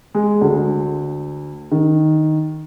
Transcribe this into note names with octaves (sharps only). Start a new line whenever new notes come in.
G#3
D2
D#3